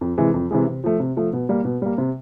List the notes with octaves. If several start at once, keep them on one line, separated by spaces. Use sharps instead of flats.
F2
C3 E3 G#3
F2
C3 E3 G#3
C3
F3 A3
C3
F3 A3
B2
G3 A#3
B2
G3 A#3
C3